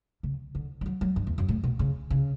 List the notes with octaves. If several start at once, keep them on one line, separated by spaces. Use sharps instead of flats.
C#3
D3
G3
F#3
F#3
G2
E2
F#2
A2
B2
C#3
C#3